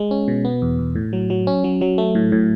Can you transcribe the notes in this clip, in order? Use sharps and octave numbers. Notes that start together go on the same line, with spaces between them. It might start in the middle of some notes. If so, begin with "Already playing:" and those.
Already playing: G#3
C#4
B2
B3
E2
E2
A2
F#3
F#3
C#4
F#3
F#3
A3
A2
A2